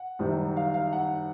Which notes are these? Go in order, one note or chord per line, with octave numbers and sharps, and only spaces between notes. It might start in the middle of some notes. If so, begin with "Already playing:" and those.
Already playing: F#5
F#1 F#2 D#3 G3
F5
F5
F#5